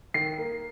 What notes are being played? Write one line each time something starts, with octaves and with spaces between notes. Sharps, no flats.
D#3 C7
A#3